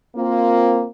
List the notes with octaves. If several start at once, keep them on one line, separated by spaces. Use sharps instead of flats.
A#3 C4 F4